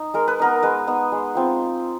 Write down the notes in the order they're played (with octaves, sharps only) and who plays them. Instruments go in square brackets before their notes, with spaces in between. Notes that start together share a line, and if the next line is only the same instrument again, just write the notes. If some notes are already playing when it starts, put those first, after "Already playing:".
Already playing: [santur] D#4
G#3 A#4
B4
B3 D#4 A#4
G#3 B4
B3 D#4
G#3
C4 F4